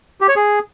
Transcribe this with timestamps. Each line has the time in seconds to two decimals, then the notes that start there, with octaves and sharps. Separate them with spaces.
0.21 G4
0.28 C#5
0.36 G#4